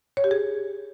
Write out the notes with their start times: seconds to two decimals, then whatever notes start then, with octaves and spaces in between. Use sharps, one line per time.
0.17 C#5
0.24 G4
0.31 G#4